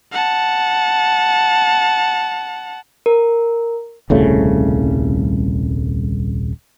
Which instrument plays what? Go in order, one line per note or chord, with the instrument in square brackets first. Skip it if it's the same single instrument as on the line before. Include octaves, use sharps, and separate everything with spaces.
[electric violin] F#5 A5
[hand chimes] A#4
[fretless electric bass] D#1 C2 C#3 A3